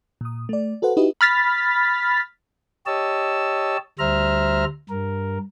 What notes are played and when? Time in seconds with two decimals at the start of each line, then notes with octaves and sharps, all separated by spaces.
0.21 A#2 D#6
0.49 A3 D5
0.82 F#4 A4 B4 C5 F#5
0.97 D#4 E4 F#4 G4 B4 D#5
1.21 B5 F6 A6 B6
2.86 G4 C#5 D#5 A5 E6
3.99 D2 G3 C5 E5 A#5 F6
4.89 G2 A#4